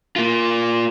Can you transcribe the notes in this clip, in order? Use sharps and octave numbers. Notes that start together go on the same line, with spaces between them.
A#3 F4